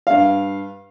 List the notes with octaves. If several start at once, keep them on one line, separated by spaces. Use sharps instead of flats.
G2 F5